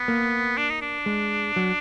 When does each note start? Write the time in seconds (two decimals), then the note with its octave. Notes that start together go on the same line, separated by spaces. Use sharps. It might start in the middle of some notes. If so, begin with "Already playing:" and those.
Already playing: B3
0.08 A#3
0.57 D4
0.70 D#4
0.82 D4
1.06 G#3
1.56 F#3